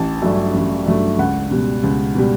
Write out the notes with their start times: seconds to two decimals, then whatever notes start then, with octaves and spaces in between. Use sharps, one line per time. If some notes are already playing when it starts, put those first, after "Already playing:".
Already playing: A1 A5
0.22 G2 F#3 A3
0.55 A1
0.86 G2 F#3 A3
1.19 C#2 F#5
1.51 B2 G3
1.84 C#2
2.15 B2 G3